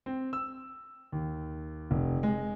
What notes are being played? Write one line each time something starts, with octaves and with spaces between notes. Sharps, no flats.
C4
E6
D#2
F1
G#3